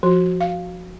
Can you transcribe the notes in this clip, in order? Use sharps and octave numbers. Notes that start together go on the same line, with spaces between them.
F3 F#4
F5